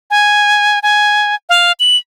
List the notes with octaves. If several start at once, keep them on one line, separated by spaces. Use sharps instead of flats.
G#5
G#5
F5
F#7